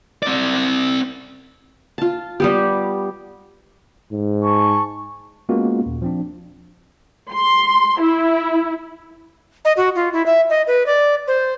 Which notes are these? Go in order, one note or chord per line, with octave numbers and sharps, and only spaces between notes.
C4 D5
F4 A5
G3 B3 G4
G#2
G#5 A5 C#6
G#3 A#3 B3 C#4 F4 F#4
D#2 A#2
F3 C4 D4
C6
E4
D#5
F#4
F4
E4
E5
D#5
B4
D5
C5